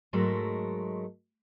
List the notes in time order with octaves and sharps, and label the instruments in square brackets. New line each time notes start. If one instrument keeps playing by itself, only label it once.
[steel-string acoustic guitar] G#2 F#3 G#3 A3 A4 A#4